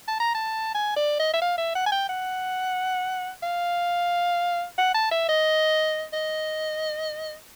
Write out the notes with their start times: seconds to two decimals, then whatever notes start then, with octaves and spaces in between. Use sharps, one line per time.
0.08 A5
0.20 A#5
0.34 A5
0.75 G#5
0.96 D5
1.20 D#5
1.34 E5
1.42 F5
1.58 E5
1.76 F#5
1.87 G#5
1.92 G5
2.09 F#5
3.43 F5
4.78 F#5
4.94 A5
5.11 E5
5.29 D#5
6.13 D#5